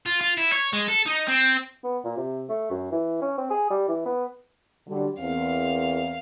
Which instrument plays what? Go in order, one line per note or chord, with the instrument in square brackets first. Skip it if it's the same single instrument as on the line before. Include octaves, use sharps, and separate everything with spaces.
[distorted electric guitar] F4
F4
E4
C#5
G#3
A4
D#4
C4
[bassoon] B3
A#2
C3
A3
F#2
E3
C#4
C4
G#4
G3
E3
B3
[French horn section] D3 F#3 G3
[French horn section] E2 C4 A#4 [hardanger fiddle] F5